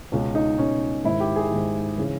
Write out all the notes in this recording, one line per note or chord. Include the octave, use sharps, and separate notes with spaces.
C#2 B2 C#4
D#4
C#2 B2 C#4
G#2 D#3 E4
G4
G#4
G#2 D#3
C#3 E3